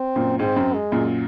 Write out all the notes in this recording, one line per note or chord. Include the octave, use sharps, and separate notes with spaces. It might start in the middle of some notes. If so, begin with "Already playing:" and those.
Already playing: C4
F#2 A#2
G#2 C4
F#2
G#3
F#2 A#2